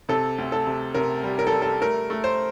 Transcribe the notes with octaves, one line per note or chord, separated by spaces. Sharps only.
C3 A4
D2
A4
C3
C3 A#4
G3
A#4
A4
G3
A4
A3 A#4
A3
C5